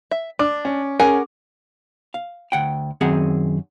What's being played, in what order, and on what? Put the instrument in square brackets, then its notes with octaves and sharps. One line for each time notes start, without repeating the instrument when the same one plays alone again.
[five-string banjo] E5
[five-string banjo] D4 [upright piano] D6
[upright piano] C#4
[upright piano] C#4 G#4 [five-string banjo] A#4 F#5 G#5
[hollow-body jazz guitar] F5
D2 F#5 G5
F#2 D#3 C4 G#4 F#5